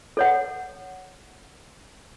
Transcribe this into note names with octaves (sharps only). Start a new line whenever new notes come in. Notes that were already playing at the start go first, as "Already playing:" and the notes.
A4 C#5 F#5